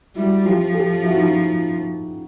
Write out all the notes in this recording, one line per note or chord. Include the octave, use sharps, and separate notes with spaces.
G3 E4 F#4
F3 F4 G4
G4 A4
E4 F#4
D#4 F4